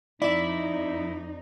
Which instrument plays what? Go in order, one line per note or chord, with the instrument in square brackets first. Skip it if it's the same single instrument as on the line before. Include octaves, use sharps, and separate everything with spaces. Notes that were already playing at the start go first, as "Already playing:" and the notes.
[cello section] F2 D#4 [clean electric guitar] E4 E5 [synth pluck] D5